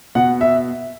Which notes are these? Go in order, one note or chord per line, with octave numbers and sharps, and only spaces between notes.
B2 F#5
E5